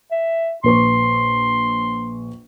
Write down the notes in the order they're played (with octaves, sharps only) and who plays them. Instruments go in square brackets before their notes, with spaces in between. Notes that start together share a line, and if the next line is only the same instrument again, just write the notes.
[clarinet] E5
[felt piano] A#1 B4 C#6 [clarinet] C6